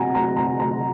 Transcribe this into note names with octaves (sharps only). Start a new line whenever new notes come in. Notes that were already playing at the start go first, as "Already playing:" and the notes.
Already playing: C3 F#5 G#5 A#5
A#5
A#5
A#5